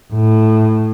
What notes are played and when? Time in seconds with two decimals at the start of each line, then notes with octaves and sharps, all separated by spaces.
0.13 A2